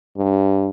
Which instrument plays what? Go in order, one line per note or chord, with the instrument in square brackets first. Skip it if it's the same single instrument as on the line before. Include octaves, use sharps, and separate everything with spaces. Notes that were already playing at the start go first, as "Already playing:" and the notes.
[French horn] G2